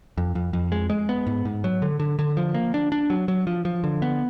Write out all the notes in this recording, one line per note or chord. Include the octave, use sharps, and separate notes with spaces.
F2
F2
F2
G#3
G#3
B3
G#2
G#2
F#3
D3
D3
D3
F3
A#3
D4
D4
F#3
F#3
F3
F3
D3
B3